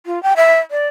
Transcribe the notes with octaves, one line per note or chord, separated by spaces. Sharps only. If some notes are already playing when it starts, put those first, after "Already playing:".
F4
G5
E5
D5